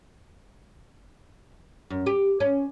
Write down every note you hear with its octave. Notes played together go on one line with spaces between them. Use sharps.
F#2
G4
C#4